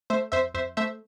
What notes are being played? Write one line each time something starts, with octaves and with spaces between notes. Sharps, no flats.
A3 C5 E5
F2 C5 E5
F2 C5 E5
A3 C5 E5